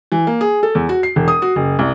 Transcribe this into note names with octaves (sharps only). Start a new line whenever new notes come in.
E3
A#3
G#4
A4
E2
F#4
C7
E1
D#6
F#4
F#1
C2